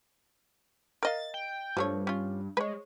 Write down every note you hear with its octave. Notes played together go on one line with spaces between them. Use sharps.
A#4 D#5 F5 A6
G5
G2 F3 A3 C#5
C#4 F4
G#3 B4 C#5